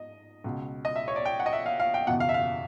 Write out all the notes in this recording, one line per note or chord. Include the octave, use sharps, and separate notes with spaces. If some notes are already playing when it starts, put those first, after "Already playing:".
Already playing: G#2 D#5
C#2 B2
D#5
E5
C#5
D5
G5
F#5
D#5
E5
F5
F5
G5
F#1 E2 B2 F#5
F5
E5
F5